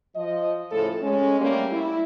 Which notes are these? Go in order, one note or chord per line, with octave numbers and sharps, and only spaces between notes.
F3 D#5
A2 C#3 F3 A4
G#3 C#4
G3 A3 A#3 C#4 G4
E4